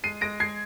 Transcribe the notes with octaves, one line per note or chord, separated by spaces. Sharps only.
G#3 C7 D#7
G#3 A#6 D7
G#3 G#6 C7